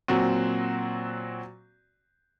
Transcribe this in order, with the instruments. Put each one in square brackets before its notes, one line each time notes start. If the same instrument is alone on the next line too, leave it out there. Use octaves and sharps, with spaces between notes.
[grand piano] A#2 F#3 C4 F#4